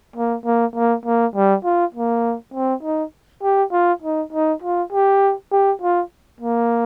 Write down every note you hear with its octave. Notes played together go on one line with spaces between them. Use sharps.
A#3
A#3
A#3
A#3
G3
F4
A#3
C4
D#4
G4
F4
D#4
D#4
F4
G4
G4
F4
A#3